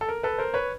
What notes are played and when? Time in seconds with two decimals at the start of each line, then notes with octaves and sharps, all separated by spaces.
0.01 A4
0.09 A#4
0.23 A4 B4
0.38 A#4 C5
0.54 B4 C#5